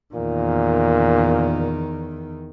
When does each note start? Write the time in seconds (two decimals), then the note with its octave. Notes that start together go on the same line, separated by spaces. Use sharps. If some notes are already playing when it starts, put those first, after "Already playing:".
0.15 E2 A#2 D#3